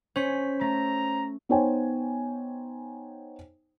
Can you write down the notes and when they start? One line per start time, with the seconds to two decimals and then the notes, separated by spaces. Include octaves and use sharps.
0.16 C#4 C5 C#5 B6
0.61 A3 A#5
1.49 B3 D#4 C5 C#5 G5 G#5